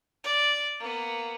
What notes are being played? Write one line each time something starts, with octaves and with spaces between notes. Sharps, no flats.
D5
A#3 B3